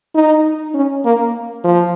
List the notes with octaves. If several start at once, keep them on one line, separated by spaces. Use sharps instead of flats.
D#4
C#4
A#3
F3